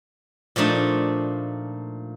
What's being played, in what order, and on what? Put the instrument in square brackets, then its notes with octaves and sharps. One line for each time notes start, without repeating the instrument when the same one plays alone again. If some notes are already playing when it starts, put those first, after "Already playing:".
[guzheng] A#2 F3 A3 D4 D#4